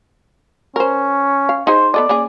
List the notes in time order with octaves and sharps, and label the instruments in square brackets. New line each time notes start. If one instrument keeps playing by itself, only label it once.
[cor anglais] C#4 [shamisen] A#4 C5
[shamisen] F5
[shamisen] D#4 G#4 [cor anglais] C5
[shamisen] B3 A4 D#5 [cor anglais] D5
[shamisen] A#3 C#4 G#4